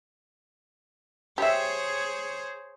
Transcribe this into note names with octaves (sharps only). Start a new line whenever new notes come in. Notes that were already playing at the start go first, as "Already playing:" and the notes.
G4 G#4 C5 C#5 E5